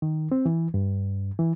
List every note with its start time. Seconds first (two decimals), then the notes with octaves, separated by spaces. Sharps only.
0.02 D#3
0.32 C4
0.46 E3
0.74 G2
1.39 E3